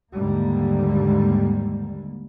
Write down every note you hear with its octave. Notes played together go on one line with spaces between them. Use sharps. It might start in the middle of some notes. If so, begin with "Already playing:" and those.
D#2 G#2 D3 G3 A#3